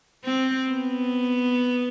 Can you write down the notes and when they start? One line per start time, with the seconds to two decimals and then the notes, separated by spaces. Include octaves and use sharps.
0.25 C4
0.70 B3